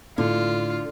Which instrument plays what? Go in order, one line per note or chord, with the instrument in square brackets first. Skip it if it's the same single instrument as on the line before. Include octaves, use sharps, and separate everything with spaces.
[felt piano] A2 [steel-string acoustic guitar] D3 [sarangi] F4